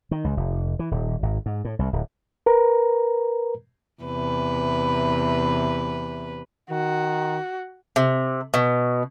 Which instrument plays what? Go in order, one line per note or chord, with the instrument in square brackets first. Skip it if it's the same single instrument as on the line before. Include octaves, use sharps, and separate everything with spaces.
[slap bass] D#3
C#2
F1
E3
D#1
G#1
G#2
A2
C2
D1
[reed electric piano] A#4 B4 A#5
[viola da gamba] E2 C3 B4
[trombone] D#3 [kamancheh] F#4
[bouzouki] C3
B2